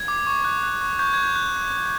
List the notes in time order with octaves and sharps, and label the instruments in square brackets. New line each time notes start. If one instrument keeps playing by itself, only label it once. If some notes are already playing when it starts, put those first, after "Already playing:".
Already playing: [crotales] G#6
D6
C#6
F#6
F#6
C#6
C#6 G6
F#6 G#6
G6
F#6